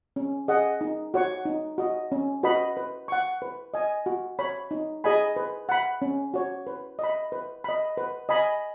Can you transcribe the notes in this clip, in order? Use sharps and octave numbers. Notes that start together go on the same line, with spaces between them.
C#4
G#4 D#5 F#5
D#4
F#4 C#5 F#5 C#6
D#4
F#4 D#5
C#4
F#4 B4 D#5 B5
B4
F#5 C#6
B4
D#5 G#5
F#4
C#5 B5
D#4
G#4 D#5 G#5 B5
B4
F#5 B5
C#4
F#4 C#5
B4
D#5 B5
B4
D#5 B5
B4
D#5 G#5 B5